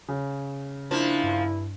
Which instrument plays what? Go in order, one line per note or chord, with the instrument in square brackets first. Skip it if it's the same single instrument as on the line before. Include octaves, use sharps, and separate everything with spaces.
[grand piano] C#3
[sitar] F3 A#3 [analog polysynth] D4 [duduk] E4
[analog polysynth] G2